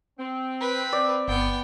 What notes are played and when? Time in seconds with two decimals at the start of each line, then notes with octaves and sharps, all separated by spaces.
0.18 C4
0.61 B4
0.93 D5
1.28 G1 B3 G5